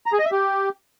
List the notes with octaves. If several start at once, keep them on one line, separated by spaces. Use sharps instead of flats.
A#5
G#4
D#5
E5
G4